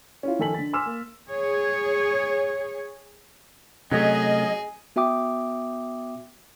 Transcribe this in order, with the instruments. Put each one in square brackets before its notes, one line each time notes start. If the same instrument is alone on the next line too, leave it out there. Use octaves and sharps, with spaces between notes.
[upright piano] C#4 E4 F4
D#3 F3 A4 G#5 B6 F#7
D3 A6
G#5 C6 D6 E6 F6 E7
A#3
[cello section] G#4 C#5
[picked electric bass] C3 A3 [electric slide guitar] F#3 C#4 [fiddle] G#4 [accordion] D#5
[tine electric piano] B3 F#4 E5 G5 D6 D#6